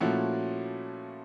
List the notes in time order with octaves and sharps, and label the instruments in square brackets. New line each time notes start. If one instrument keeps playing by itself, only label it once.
[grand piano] A#2 F3 A3 C#4 [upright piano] E4 F#4